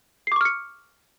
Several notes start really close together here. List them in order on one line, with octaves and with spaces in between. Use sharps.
C7 D6 C#6 F6 C#7